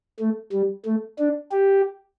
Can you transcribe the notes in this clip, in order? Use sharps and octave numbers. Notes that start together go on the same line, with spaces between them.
A3
G3
A3
D4
G4